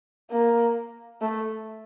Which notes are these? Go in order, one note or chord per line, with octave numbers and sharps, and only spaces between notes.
A#3
A3